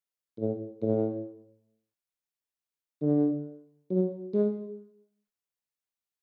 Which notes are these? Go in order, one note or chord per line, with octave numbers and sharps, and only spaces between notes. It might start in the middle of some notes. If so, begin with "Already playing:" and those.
A2
A2
D3
F#3
G#3